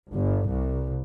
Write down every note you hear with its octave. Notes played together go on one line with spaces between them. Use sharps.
G1
C2